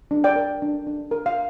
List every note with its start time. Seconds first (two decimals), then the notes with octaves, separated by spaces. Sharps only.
0.11 D4
0.24 D5 G5
0.36 A#4
0.62 D4
0.87 D4
1.11 A#4
1.26 F5